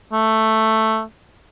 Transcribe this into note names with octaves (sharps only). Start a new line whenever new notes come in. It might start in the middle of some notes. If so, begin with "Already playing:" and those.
A3